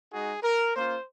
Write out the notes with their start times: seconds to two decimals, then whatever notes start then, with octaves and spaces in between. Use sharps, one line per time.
0.12 G#3 D#4 F#4 G#4
0.43 A#4
0.75 A#3 C#4 F4 C5